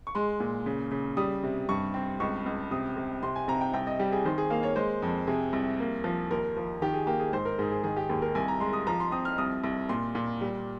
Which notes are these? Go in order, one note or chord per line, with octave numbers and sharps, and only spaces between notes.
C#6
G#3 C6
A#2
C#3
C#3
G3 D#6
C3
G2 C#6
C4
C#2 C#6
C#2
C3 D#6
C3
C3 C6
G#5
C3 A#5
G5
C2 G5
D#5
G3 G4
G#4
D#3 C5
G#4
A#3 F5
C#5
G#3 C5
F2
C3 G#4
C2
A#3
F3
D#2 A#4
F3
D#3 G4
G#4
A#3 G4
G#4
G#2 C5
A#4
G#2 G#4
G#4
D#3 G#4
G4
D#2 G#4
A#4
C2 G#5
A#5
G#3 C6
D#6
F3 A#5
C6
C4 D#6
F6
C2 D#6
C2
A#2 C6
A#2
G3